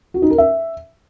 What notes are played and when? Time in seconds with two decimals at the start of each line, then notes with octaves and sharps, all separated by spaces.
0.14 F#4
0.22 D#4
0.30 A#4
0.38 E5